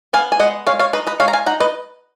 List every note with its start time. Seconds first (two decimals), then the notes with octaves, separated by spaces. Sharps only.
0.13 B3 F5 G#5
0.32 G#5
0.40 G#3 D#5 F#5
0.67 G#3 C#5 F5
0.79 C#5 F5
0.93 D#4 B4 D#5
1.07 B4 D#5
1.20 G#3 C#5 F5
1.28 A#5
1.33 F5 G#5
1.46 D#4 F#5 A#5
1.60 B4 D#5